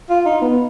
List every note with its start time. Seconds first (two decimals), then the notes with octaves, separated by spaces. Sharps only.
0.10 F4
0.26 D#4
0.41 B3